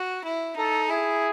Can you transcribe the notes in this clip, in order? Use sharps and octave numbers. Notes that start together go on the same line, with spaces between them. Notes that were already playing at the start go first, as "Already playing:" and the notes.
Already playing: F#4
E4
D#4 A4
E4 G#4